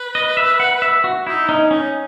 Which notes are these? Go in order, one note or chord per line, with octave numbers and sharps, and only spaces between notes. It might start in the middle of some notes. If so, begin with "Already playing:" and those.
Already playing: B4
D#5
E5
F#5
E5
F#4
D#4 E4
C#4 D#4
C#4 D#4